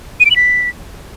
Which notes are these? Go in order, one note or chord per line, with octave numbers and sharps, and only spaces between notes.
D#7
D7
F#7
B6